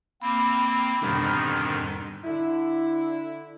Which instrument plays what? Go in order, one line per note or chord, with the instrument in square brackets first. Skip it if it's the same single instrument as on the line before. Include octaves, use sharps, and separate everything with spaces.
[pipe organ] A#3 C4 [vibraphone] B5 D6
[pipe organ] F2 G#2 D#3 [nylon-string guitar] B2 D3 G3
[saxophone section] D3 E4